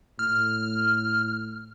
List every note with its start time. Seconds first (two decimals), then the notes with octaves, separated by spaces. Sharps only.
0.19 A2 F6